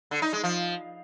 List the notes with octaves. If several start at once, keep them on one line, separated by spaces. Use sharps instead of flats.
D3
D#4
G#3
F3